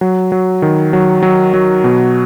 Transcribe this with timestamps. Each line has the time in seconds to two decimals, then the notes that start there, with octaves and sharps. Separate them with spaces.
0.01 F#3
0.32 F#3
0.62 D#3
0.93 F#3
1.23 F#3
1.54 F#3
1.84 B2